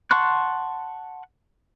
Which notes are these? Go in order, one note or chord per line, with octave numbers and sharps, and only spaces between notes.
F#5 A5 C6 C#6 F#6